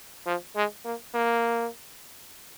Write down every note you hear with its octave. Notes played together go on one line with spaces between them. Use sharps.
F3
G#3
A#3
A#3